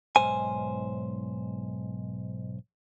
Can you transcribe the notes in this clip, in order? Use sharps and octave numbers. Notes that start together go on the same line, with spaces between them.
B1 G#2 C5 G#5